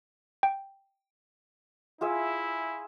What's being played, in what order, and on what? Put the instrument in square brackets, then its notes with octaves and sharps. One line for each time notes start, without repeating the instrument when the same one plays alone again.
[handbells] G5
[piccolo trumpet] E4 [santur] F4 G#4 E5